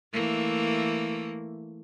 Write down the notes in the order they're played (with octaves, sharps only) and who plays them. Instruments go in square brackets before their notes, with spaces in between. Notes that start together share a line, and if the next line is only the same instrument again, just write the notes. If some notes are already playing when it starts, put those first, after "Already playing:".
[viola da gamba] E3 A3 A#3